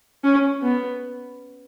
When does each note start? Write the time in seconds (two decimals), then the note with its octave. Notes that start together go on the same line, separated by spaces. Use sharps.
0.24 C#4
0.62 B3